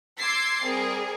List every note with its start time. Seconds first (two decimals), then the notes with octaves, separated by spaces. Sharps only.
0.18 C6 D6 E6 G#6 A6 C7
0.62 G3 C4 G#4 A#4